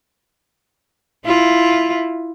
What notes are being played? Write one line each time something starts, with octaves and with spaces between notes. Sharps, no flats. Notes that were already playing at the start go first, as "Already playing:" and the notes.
E4 F4